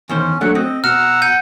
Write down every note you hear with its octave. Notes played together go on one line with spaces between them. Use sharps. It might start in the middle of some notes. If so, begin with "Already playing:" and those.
E2 D#3 C#4 C5
F#3 A3 D4 F#5
C4 D#5
B2 F#5 A#5 E6 F6
F#5 G6 D#7